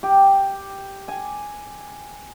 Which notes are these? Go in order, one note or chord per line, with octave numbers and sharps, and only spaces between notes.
G4
G#5